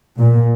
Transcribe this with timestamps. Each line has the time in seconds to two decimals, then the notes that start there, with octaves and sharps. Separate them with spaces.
0.18 A#2